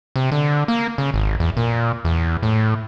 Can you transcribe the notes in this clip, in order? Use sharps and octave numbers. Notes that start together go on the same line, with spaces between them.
C3
D3
A#3
C#3
G#1
E2
A#2
E2
A2